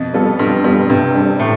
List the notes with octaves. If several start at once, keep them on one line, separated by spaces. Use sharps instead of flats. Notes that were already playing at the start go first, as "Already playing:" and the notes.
Already playing: F2 B2
G3 B3 F4 A4
G2 B2
G2 G3 B3 F4 A4
G2 C3
G3 D4 A4 C5
A2 C3